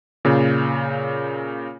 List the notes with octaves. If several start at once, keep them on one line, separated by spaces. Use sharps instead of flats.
A#2 C#3